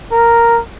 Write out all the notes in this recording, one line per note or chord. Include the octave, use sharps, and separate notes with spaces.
A#4